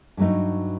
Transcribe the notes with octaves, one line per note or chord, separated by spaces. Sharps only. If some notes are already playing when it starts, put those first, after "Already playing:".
G2 F#3 A3 D#4